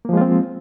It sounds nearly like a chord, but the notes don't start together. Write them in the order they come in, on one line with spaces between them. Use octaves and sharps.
A#3 F3 G#3 F4 C4